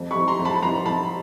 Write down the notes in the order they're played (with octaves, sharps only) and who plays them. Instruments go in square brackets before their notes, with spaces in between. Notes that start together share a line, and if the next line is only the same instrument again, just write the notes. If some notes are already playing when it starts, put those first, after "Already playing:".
Already playing: [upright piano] F2
B5 C#6
F2
A#5 C6
F2
A5 B5
B5
F2 A#5 C6
F2 A5 B5